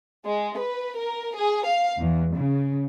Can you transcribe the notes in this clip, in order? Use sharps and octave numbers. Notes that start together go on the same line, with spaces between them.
G#3
B4
A#4
G#4
F5
E2
C#3